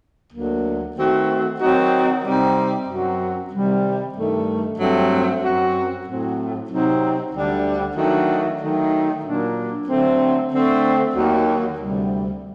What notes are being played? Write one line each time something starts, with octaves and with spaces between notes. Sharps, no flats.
D2 D3 F#3 A#3
D#3 A3 C4 F#4
D#3 F#3 C4 D#4 F#4
C3 G3 C4 D#4
F#2 F#3 C4 F#4
C3 D#3 G3
G2 D#3 A3
G2 F#3 A3 C4
F#2 F#3 C4 F#4
A2 F#3 C4
C3 F#3 C4 D#4
D2 D3 G3 D4
D#3 F#3 A3 D4 F#4
D#3 F#3 A3 D#4
A#2 F#3 A#3 D4
D3 F#3 A3 C4
D3 A3 C4
D#2 D#3 F#3 A#3 F#4
D2 C3 G3